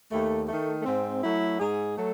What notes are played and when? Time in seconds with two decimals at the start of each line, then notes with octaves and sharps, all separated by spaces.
0.11 D#2 A3
0.49 D#3 A3
0.80 A3
0.85 G#2 C4
1.23 F#3 A3 E4
1.60 G#2 G#4
1.97 F#3 A3 A4